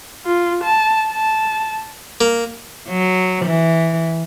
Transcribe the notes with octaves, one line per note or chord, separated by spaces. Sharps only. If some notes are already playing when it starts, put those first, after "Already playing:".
F4
A5
A5
A#3
F#3
E3